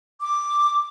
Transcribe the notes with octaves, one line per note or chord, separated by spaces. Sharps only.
D6